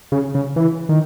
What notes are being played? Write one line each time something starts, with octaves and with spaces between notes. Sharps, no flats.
C#3
C#3
E3
D#3